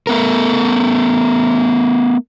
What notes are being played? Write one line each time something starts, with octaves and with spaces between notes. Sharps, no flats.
A3 B3 A#4